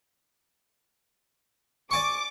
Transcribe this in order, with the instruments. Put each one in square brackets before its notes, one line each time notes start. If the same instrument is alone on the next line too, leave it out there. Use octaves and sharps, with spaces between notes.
[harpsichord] D5 G#5 C#6 [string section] D6